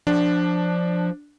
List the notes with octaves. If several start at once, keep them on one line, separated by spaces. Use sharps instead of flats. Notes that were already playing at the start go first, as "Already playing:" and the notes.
F3 D4